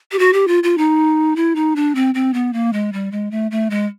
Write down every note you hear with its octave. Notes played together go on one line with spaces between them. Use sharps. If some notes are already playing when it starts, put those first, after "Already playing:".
G4
F#4
G4
F4
F4
D#4
E4
D#4
D4
C4
C4
B3
A#3
G#3
G3
G#3
A3
A3
G#3